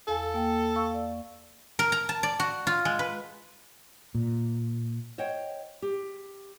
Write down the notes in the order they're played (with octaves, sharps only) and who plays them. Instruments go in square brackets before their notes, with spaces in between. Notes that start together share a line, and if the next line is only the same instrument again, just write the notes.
[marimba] E2 F5 G#5 [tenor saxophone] A4
[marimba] A#3 G5
F5 C#6 E6
D5
[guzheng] A#4
A#5
A5
D5
F#4
F4
G#3
B4
[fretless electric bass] A#2
[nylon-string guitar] C5 C#5 D#5 F#5 G5
G4